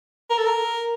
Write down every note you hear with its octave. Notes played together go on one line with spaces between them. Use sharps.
A#4
A4
A#4